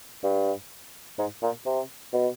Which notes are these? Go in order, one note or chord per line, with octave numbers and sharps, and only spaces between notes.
G2
G#2
A#2
C3
B2